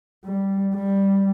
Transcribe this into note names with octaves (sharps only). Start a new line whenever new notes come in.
G3
G3